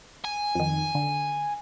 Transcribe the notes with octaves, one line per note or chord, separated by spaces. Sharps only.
G#5
F2 D#3
D3